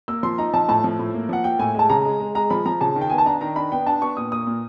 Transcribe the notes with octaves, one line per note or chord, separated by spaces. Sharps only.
A#3 E6
F3 C6
D#4 A#5
F3 A5
A2 A5
F3
A2
A#3
F3 F#5
A#3 G5
A2 G#5
G#3 A5
C#3 A#5
G#3
G#3
G#3 A#5
F3 B5
F3 A#5
C#3 A5
D#3
G5
B3 G#5
A5
D4 A#5
D#3 A#5
D4 B5
B3 G5
D4 A5
B3 C#6
A#2 D#6
A#3 D#6
A#2